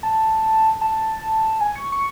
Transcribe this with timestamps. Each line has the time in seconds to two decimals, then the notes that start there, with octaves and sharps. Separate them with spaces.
0.03 A5
0.81 A5
1.61 G#5
1.76 C#6
1.92 C#6